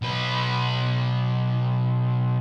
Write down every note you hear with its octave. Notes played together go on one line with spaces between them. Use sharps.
B1 B4